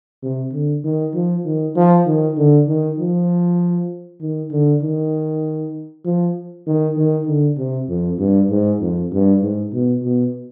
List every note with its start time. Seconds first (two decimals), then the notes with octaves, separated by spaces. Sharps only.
0.23 C3
0.53 D3
0.84 D#3
1.14 F3
1.45 D#3
1.76 F3
2.06 D#3
2.37 D3
2.68 D#3
2.98 F3
4.21 D#3
4.51 D3
4.83 D#3
6.05 F3
6.67 D#3
6.97 D#3
7.27 D3
7.57 C3
7.89 F2
8.19 G2
8.50 G#2
8.80 F2
9.12 G2
9.42 G#2
9.73 B2
10.03 B2